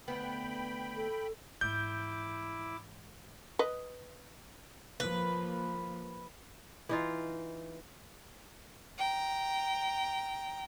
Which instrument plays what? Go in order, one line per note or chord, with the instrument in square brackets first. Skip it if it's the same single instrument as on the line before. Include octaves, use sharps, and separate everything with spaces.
[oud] D2 B3 [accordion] G5 B5
[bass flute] A4
[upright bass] G#2 E3 [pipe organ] E4 D6 [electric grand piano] G6
[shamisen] B4 D#5
[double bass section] F3 A#3 [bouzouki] B4
[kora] E3 D#4 F4
[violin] G5 A#5